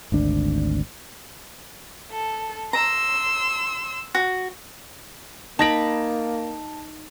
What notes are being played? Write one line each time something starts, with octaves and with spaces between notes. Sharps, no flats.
G#1 D2 D4
A4
A#5 C6 E6
F#4
A#3 D#4 A5 B5 A#6 D7